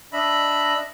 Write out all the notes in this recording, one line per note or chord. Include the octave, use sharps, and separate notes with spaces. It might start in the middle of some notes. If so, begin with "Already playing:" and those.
D4 D#5 E5 B5